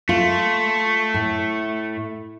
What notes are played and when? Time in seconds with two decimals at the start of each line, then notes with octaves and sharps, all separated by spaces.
0.09 A3 F4
1.14 A2